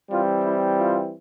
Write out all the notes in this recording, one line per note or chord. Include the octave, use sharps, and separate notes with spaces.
E3 G3 C4 F4
E4
F4